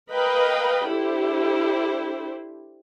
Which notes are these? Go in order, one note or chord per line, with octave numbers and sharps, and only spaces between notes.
A#4 B4 D#5 F5 G5 B5
D4 E4 G4 A4 C5